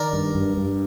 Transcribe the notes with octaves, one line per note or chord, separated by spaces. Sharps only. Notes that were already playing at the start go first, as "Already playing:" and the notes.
Already playing: D#3 A#4 D5
G2
G2
G2